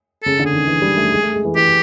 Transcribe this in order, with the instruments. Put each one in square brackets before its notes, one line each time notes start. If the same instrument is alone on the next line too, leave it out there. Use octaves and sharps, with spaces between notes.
[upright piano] C#3 [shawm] A4
[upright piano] D3
[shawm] G#4
[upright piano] D#3
E3
G3
A3
G#3
A3
G#3
E3
[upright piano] E3 [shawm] G4